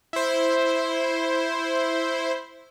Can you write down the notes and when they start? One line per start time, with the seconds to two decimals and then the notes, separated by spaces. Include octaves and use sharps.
0.13 E4 C5